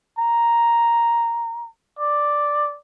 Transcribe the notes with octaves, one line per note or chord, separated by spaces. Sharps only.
A#5
D5